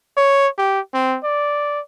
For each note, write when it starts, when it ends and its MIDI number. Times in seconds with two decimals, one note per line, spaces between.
0.17 0.47 73
0.58 0.80 67
0.94 1.17 60
1.24 1.80 74